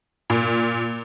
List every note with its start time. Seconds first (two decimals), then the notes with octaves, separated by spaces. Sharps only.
0.30 A#2